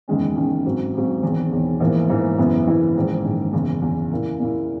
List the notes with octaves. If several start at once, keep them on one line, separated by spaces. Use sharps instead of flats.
F#1 E2 D#3 G#3 C#4
F#1 E2 D#3 G#3 C#4
G#1 G#2 F#3
G#1 G#2 F#3
E1 E2 D#3
E1 E2 D#3
A#1 G#2 E3 A#3
A#1 G#2 E3 A#3
F#1 F#2 E3 B3 E4
F#1 F#2 E3 B3 E4
A#1 G#2 D#3
A#1 G#2 D#3
F#1 E2 C#3
F#1 E2 C#3
A#2 A#3 E4
A#2 A#3 E4